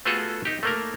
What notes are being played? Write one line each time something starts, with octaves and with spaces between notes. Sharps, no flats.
A3 B3 F4 F#4 G#4 A4
D#4 G4
A3 A#3 A#4